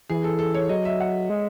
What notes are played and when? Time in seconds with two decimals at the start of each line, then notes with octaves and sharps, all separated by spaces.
0.10 E3 G#4
0.24 A4
0.39 A4
0.54 C#5
0.69 F#3 D#5
0.85 E5
1.00 F#5
1.30 G#3